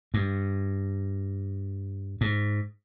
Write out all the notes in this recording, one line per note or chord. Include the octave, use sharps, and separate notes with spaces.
G2
G#2